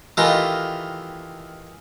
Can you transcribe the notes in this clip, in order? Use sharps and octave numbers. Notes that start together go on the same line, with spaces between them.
D#3 E3 A3 F4 G4 A#4